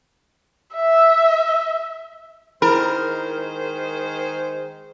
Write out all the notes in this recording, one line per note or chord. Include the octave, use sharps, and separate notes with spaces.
E5
D#3 G#3 E4 A#4 C5 B5